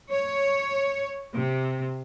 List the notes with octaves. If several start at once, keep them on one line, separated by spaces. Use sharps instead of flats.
C#5
C3